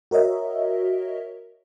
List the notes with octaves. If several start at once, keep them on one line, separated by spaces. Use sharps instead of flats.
F#4 A#4 C#5 D#5 E5